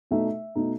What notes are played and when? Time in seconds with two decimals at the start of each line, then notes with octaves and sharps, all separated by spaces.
0.11 B2 A3 D#4 E5
0.55 B2 A3 D#4